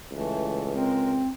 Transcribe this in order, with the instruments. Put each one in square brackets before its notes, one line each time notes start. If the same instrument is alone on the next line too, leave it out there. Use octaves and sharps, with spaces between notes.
[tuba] C#2 [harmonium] E3 A3
[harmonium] G#3 A#4 [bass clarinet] C4